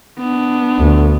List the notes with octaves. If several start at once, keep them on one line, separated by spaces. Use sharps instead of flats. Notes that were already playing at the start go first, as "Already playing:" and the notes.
B3 D4
D2